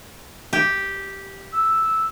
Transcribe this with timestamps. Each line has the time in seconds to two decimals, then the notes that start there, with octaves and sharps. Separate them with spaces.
0.53 G4
1.53 E6